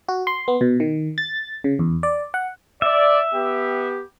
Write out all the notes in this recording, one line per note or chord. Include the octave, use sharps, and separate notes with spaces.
F#4
C6
B3
B2
D#3
A6
C#3
E2
D5
F#5
D5 E5
B3 G4